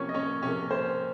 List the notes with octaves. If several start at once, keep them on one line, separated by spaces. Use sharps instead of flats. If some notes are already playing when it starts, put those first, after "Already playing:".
Already playing: C3 F3 A#3 C#4 C#5
D#5
C#4 C#5
C3 F3 A#3 C#4 C#5
C5